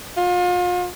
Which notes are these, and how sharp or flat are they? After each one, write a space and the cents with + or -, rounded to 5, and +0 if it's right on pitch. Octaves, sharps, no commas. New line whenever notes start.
F4 +35